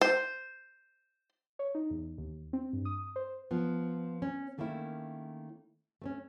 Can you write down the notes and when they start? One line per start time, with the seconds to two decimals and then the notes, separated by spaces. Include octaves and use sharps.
0.01 C5
1.59 C#5
1.75 D#4
1.90 E2
2.18 D#2
2.53 C4
2.73 G2
2.85 D#6
3.16 C5
3.51 F3 B3
4.22 C#4
4.58 D#3 A3 A#3 C#4 E4
6.02 A3 C4 C#4